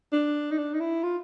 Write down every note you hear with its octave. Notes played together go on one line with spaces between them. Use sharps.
D4
D#4
D4
D#4
E4
F4